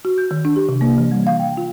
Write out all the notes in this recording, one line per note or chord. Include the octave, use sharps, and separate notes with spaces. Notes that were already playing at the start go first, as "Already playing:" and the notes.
F#4
G6
D#3
D4
G4
C3
A#3
E3
G3
F5
G5
F4